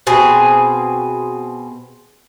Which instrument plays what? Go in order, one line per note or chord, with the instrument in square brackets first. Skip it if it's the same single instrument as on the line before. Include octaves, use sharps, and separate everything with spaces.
[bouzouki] B2 C4 G#4